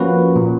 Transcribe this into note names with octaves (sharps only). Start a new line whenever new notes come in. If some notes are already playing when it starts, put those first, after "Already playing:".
Already playing: F3 A#3 C#4 F#4 B4
A#2